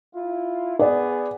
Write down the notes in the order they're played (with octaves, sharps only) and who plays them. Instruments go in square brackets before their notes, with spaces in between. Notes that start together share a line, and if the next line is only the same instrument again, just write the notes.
[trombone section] E4 F4
[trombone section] B3 G#4 [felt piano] D5